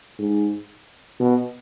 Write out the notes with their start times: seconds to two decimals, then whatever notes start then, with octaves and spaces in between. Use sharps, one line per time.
0.19 G#2
1.20 B2